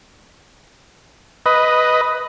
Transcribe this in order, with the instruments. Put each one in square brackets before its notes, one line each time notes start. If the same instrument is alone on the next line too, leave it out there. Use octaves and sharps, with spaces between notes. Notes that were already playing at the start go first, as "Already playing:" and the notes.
[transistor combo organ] B4 D#5